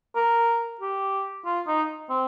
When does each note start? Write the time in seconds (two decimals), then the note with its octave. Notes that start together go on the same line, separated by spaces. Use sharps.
0.16 A#4
0.81 G4
1.45 F4
1.68 D#4
2.10 C4